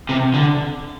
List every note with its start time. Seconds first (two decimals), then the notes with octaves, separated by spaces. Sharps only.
0.09 C3
0.34 D3